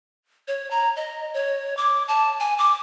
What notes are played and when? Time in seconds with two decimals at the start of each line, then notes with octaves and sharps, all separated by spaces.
0.48 C#5
0.71 A#5
0.96 D#5
1.34 C#5
1.77 D6
2.08 A5
2.40 G#5
2.58 D6